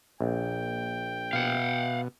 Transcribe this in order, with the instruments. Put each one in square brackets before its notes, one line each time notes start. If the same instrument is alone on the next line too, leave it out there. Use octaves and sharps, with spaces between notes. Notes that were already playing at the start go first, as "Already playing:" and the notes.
[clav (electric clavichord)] A#1 [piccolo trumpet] G5
[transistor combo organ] B2 [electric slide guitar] F5 F#5